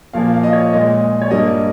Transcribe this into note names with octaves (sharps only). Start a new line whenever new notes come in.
A#2 F3 A#3 F5
F5
D#5
C#5
A#2 G#3 D#5
C#5
G2 G3 A#3 D#5